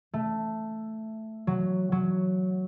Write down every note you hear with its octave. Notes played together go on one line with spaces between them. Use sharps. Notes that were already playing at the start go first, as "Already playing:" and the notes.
A3
F#3
F#3